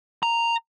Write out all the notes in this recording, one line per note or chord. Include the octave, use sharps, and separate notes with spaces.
A#5